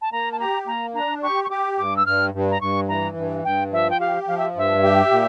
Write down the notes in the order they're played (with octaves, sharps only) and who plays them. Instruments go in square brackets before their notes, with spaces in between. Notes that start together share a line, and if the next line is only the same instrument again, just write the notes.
[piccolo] A5
[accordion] A#3 [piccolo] A#5
[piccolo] A5
[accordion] G4 [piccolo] A#5
[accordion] A#3 [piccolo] A#5
[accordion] D4 [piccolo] A#5
[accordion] G4 [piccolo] C#6
[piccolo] C#6
[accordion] G4 [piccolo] D6
[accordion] G2 [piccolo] D6
[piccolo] E6
[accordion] G2 [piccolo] F6
[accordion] G2
[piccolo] A#5
[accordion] G2 [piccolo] C#6
[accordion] E3 [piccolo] A#5
[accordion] G2
[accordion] G2 [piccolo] G5
[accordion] F3 [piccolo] E5
[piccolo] G5
[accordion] G4 [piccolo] F5
[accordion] F3 [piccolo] F5
[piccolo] E5
[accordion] G2 [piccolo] E5
[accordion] G4
A#2